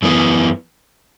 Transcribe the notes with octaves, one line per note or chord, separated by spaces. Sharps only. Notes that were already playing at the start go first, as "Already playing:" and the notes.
F#2 E3 B3